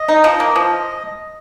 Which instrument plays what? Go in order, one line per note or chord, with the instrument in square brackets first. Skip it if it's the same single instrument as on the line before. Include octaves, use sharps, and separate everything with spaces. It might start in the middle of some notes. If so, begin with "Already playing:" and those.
Already playing: [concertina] D#5
[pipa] D#4
F3
A#3
F3